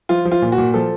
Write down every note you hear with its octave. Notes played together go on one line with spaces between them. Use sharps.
F3 F4
F3
F4
A#2
F#4
A#2
F3 A4